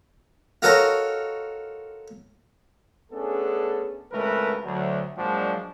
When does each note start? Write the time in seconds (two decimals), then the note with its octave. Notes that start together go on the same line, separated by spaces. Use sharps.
0.62 F4 F#4 A4 A#4 C#5 D#5
3.11 A3 B3 C#4 D4 G#4 A4
4.12 G#1 C#2 A3 A#4 B4
4.64 D2 F#3
5.16 A#2 F3 F#3 G#3 D4 F#4